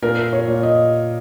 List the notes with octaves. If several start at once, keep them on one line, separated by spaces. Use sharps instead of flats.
A#2 A#4
C#5
A#2
D#5